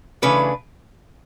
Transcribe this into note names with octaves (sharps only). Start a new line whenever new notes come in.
C#3 E3 A3 D4 B4